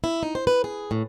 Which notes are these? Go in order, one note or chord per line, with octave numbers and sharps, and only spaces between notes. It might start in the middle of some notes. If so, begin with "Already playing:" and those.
E4
D#4
C5
B4
G#4
A2